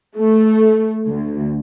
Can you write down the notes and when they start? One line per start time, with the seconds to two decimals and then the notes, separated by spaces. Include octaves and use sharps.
0.17 A3
1.06 D2